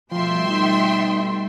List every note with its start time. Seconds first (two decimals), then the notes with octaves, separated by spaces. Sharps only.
0.12 B2 F3 G3 A3 E5 G5 C6
0.49 D#4